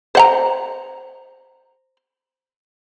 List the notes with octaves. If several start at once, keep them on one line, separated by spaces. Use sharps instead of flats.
C5 F#5 A#5